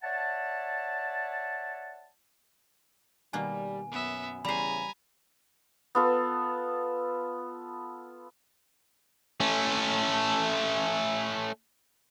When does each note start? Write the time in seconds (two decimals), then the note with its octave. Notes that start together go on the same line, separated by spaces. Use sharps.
0.03 C#5 D5 E5 F#5 A5
3.33 B2 D#3 G3 A#3 G#5
3.92 F#2 B3 E5
4.45 E2 C#3 G3 C5 G#5 A#5 B5 B6
5.95 B3 F4 A4
9.40 A3 C#4